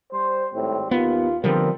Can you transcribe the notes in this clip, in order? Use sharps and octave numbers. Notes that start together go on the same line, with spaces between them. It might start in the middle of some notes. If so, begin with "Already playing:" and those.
G3 C5
G#1 A2 G3 C4
D#2 B3 F4
D3 F3 G3 B3 C4 A#4